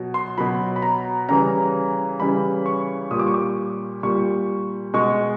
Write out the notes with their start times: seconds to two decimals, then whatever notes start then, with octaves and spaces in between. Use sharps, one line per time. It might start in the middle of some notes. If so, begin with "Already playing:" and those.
Already playing: B2 F#3
0.14 C6
0.38 B2 F#3 B5
0.76 B5
0.82 A#5
1.29 C#3 E3 G3 A#5
2.20 C#3 E3 G3 B5
2.66 C#6
3.11 A#2 G3 D#6
3.19 D6
3.27 C#6
3.34 D6
4.03 A#2 G3 C#6
4.94 B2 G#3 C#6